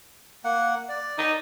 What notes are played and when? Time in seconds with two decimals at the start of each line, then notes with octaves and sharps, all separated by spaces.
0.44 A#3 F#5
0.89 D5
1.18 D#4